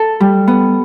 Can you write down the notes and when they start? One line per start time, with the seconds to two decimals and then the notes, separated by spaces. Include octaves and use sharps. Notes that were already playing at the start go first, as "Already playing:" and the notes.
Already playing: A4
0.20 G3
0.48 B3